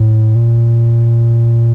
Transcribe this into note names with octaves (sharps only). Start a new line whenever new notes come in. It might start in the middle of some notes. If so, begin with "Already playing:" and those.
Already playing: A2
A#2